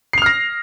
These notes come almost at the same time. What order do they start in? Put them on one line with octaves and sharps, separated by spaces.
C7 F7 F6 A#6